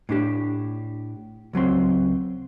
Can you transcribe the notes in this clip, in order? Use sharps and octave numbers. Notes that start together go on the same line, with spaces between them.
A2 D4 G4
C#2 F#3 C4 C6